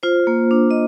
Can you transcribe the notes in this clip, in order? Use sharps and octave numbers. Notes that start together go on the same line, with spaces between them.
F4 C5
A#3
D4
D#5